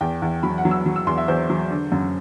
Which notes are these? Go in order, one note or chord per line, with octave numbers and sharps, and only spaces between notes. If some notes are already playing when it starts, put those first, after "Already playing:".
E2 G5
E2
F#3 B5
F#5
F#3
E6
F#3
E6
E2 C6
E5
E2 C5
F#3
D3
F#2